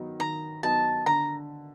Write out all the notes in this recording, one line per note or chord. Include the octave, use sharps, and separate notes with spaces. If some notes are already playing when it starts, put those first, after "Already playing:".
Already playing: D#3 F#3 B3 D#4
D#3 A#5
F#3 B3 D#4 A5
D3 A#5